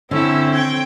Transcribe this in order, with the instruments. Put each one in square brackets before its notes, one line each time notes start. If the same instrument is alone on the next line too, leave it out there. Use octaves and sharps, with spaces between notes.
[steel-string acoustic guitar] D3 [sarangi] C4 [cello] C#4 E4 [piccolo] E6
[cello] G5 [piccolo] G#6